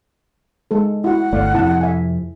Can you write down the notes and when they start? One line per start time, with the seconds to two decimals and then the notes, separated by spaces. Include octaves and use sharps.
0.71 G#3 A4
1.04 E4 F#4 F#5
1.33 G1 A3 D5 F5
1.54 F2 C3 E4 A5
1.81 E5 G#5